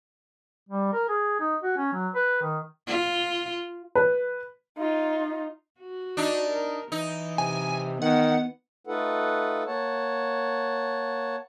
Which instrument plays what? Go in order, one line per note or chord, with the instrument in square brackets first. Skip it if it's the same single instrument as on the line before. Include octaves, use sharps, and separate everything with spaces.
[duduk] G3
A#4
G#4
D#4
F#4
C#4
F#3
B4
D#3
[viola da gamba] F4
[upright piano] B4
[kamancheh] D#4 F4
[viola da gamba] F#4
[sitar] D4 D#4
[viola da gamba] A#4
[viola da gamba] E3 [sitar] D#4
[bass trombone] C3 [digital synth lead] G#5
[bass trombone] D#3 [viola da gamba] B3 [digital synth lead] F#5
[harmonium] A3 D#4 F4 A4 B4 F#5
A#3 C#5 F#5 A5